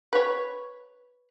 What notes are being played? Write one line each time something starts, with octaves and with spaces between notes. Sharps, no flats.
B4 C#5